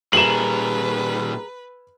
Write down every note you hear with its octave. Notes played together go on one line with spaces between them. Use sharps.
A#2 G3 G#4 A#4 B4 E7 F#7